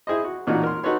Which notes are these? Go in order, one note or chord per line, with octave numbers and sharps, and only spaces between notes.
E4 G#4 C5 D#5
F#4
A1 A#2 A#3 D#4 F#4
A#4 C6
D#4 F#4 A4 B4 C#5 C6